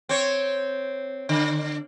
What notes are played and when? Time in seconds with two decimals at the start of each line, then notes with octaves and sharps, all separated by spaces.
0.09 C4 C#5
1.29 D3